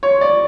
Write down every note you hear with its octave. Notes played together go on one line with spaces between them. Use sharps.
C#5
D5